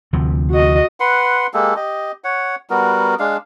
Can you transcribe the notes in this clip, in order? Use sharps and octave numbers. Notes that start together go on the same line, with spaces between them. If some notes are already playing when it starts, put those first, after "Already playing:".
D2 C3 F3
F#4 D#5
B4 F#5 C6
G#3 A#3 G4 A4
G4 D#5
C#5 F#5
G3 B3 F#4 A#4
G#3 D4 F5